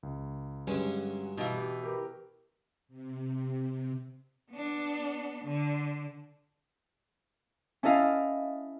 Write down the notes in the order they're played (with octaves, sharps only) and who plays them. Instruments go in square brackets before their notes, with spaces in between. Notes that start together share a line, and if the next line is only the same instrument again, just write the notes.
[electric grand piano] C#2
[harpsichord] G2 D3 [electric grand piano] F#3 G#3 F#4 [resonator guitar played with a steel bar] C#4
[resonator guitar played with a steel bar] B2 E3 [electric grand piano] D#4 D#5 F5
[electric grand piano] G4
G4 A#4 B4
[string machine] C3
[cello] B3 D4
D3
[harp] C#4 E4 A4 D#5 F5